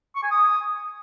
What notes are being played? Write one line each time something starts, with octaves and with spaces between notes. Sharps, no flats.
C#6
G#5
D#6